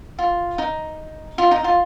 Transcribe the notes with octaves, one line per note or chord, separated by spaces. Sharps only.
F4
D#4
F4
D#4
F4